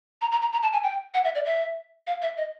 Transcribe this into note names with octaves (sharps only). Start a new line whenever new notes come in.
A#5
A#5
A#5
A#5
A5
G#5
G5
F#5
E5
D5
E5
F5
E5
D#5